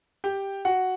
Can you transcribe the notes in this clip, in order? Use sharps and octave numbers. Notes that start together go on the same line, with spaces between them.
G4 G5
F#4 F#5